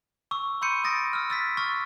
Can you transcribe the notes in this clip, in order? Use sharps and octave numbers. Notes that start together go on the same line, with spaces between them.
C#6 D6 E6
B5 C6 E6 G6 C#7 D#7
D#6 A6 A#6 D7
E6 F6
E6 A6 B6
C#6 D6 E6 F6 A6